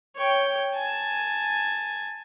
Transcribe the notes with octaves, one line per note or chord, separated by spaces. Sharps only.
C#5 G5
G#5 A5